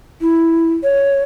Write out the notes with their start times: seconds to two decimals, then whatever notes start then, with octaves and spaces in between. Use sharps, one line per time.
0.21 E4
0.84 C#5